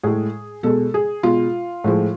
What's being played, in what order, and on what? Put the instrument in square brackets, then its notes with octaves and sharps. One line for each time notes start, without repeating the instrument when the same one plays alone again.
[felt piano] A2 G#3 G#4
B2 G#3 A4
G#4
B2 G#3 F4
A2 F3 G#3